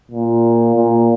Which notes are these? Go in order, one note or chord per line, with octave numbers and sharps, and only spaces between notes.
A#2
A#2